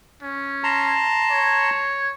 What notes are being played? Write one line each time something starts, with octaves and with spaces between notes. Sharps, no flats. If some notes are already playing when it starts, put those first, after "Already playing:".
C#4
A5 A#5 C6
C#5